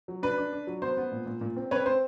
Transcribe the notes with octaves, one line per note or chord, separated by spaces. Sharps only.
F#3
D4 B4
D4
D4
F#3
B3 C5
B3
A#2
A#2
A#2
C4
C4 B4 C#5
C4 C5